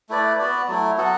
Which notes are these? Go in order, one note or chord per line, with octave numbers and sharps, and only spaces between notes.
A3 E4 B4 D5
B3 F#4 B4 D5
F#3 A3 E4
F#3 B3 F#4 A4